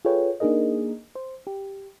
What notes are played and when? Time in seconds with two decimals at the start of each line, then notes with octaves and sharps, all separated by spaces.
0.05 F4 G#4 A4 B4 C#5 G5
0.40 A#3 D4 D#4 G#4 A#4 D#5
1.15 C5
1.47 G4